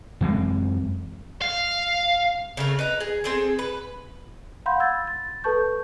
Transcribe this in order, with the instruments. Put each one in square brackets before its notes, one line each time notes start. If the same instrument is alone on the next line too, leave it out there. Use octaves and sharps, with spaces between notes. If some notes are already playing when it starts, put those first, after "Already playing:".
[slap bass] F#2 E3 G#3 C4
[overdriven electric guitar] F5
[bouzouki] C#3 A3 A#4
B4 D#5 A#5
G#4
C4 G#4 A4
B4
[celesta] F5 F#5 B5 C6 G6
E6 G#6 A6
A6
A4 B4 A5 C#6 G6